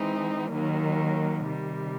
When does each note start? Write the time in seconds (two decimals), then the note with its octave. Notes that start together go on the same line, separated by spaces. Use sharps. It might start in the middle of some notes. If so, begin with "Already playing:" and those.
Already playing: E3 G#3 C4 D#4
0.52 D#2 D#3 F#3 A#3
1.46 C3 D#3 G3